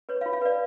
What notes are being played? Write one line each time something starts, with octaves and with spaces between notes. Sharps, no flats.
B4 C#5
F5
F4
F5
B4 D5